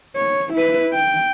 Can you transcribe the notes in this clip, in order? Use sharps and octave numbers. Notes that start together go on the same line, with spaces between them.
C#5
E4 B4
G5